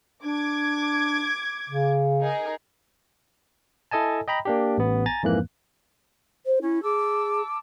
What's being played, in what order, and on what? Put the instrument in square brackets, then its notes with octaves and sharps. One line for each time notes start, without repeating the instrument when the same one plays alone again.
[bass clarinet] D4 [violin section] D6 G#6
[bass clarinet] C#3
[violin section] D#4 G#4 A#4
[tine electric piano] E4 A4 D#5 G#5 A5
D#5 G5 A#5 B5
A#3 D4 G4
A1 B3
G#5 A#5 A6
F2 G#2 E3 A#3 F#6
[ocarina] C5
[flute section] C#4 [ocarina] E4
[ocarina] G#4 [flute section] A5 D6 E6